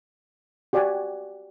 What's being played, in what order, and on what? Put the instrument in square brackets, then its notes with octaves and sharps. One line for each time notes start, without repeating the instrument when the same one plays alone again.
[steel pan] F#4 G4 D5 F#5 G#5